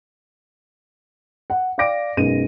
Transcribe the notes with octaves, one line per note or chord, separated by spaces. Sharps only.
F#5
D5 F5 G5 D6 A#6 D7
B1 F#2 G#3 B3 D#7